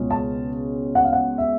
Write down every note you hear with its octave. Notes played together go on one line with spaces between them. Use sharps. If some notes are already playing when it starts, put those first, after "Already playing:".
Already playing: C#2 B2 G#3 C#4
A5
F#5
F5
F#5
E5